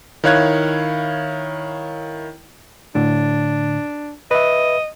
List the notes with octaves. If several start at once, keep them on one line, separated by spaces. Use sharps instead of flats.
D#3 E4 C#5 F5 F#6 G#6
A2 D3 D4
B4 D#5 E5